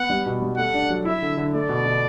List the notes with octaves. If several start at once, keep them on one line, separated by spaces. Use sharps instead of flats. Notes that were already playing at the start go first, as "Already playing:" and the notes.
Already playing: B3 F#5
G3
B2
G3
A3 F#5
D4
F#3
E4 E5
D3
D3
A3 D5
B2
B2